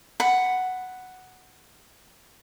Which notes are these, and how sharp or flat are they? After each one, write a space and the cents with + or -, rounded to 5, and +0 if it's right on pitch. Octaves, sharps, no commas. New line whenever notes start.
F#5 +0 B5 +15